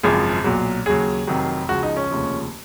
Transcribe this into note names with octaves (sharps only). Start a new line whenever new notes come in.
G#1 F#2 C#3 F3 G#4
B1 A#2 F#3
D#2 C#3 F#3 G#4
F1 F2 D#3 F#3
C#2 C#3 F3 F#4
D#4
C#4
F1 D#2 C#3 F3